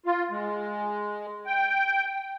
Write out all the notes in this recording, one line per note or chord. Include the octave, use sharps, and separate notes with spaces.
F4
G#3
G5